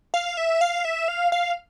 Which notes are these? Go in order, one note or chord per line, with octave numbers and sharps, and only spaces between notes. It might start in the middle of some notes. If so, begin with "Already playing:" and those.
F5
E5
F5
E5
F5
F5